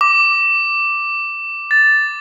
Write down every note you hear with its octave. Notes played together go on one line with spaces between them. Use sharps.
D6
A6